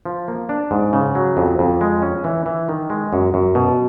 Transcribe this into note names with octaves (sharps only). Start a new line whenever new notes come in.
F3
A#3
D4
G#2
C#3
F#3
F2
F2
G#3
C#4
E3
E3
D#3
G#3
F#2
F#2
B2